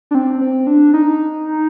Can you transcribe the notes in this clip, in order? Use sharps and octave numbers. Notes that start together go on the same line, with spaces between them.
D4
C4
C4
D4
D#4